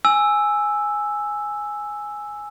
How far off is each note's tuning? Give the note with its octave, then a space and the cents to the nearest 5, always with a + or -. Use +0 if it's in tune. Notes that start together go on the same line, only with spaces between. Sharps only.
G#5 +0 E6 +0